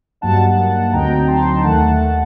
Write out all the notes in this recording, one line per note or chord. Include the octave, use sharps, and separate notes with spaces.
G2 F#3 A#3 D#4 F#5 A5
F#5 A5
F#5 A5
D2 D3 F#3 C4 D#4 G5 A#5
A5 C6
D#2 D#3 A3 F#5 A5